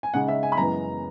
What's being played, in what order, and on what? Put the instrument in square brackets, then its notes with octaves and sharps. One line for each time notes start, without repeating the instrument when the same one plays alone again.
[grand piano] G#5
C#3 G#3 D#4 F#5
E5
G#5
B5
F#2 E3 G#3 B3 A#5